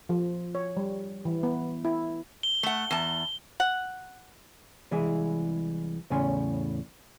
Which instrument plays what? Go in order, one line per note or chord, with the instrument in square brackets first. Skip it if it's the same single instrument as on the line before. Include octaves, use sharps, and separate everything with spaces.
[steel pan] F3
C#5
G3
E3
B3
E4
[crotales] G7
[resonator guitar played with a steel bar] A3 F#5
E2 A5
[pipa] F#5
[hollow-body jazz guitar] C2 E3 G#3 E4 G#4
E2 A2 C#3 C#4 G#5 C6